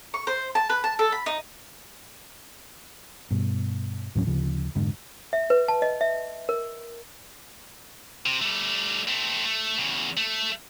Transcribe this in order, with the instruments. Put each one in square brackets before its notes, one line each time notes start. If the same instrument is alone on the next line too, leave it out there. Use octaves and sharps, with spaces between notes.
[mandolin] C#6
C5
A5
B4
A5
A4
B5
D#4
[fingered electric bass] G2 B2
D#2 A2 F#3 C#4
D2 C#3 F3
F1 G#2 D3
[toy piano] E5
B4
A5
D#5
E5
A#4
[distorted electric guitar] C3
G3 A3
A3 C4
A3
E2 C#3
A3